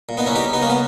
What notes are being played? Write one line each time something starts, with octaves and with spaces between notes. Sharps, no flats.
A#2
B3 D#4
C#4 E4
D#4 G4
B3 D#4
A#3 C#4
B3